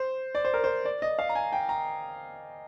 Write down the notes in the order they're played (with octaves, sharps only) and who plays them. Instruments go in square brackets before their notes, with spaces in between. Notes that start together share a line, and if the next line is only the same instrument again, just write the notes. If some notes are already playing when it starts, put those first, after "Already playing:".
Already playing: [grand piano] C5
D5
C5
A#4
C5
D5
D#5
F5
A#5
G#5
G5
A#5